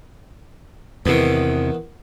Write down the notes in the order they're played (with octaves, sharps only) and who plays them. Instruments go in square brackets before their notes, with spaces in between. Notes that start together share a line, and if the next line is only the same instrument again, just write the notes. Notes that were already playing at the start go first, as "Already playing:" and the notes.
[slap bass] E2 C3 [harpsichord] D#3 E3 B3